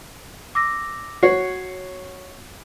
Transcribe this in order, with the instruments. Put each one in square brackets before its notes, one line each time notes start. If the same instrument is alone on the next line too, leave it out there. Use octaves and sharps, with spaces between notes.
[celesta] D6 E6 A#6
[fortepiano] F#4 C#5 [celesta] C7